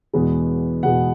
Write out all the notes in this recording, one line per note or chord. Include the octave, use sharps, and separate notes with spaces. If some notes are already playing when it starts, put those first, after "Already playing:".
E2 B2 G#3 B3
E2 B2 G#3 B3 F#5